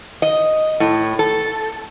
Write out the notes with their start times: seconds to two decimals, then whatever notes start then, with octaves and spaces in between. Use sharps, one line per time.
0.22 D#5
0.80 A2
1.19 A4